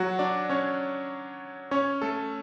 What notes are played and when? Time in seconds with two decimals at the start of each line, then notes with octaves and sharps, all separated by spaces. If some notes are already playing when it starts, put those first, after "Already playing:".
Already playing: F#3 F#4
0.19 D4 D5
0.49 C#4 C#5
1.71 C#4 C#5
2.02 A3 A4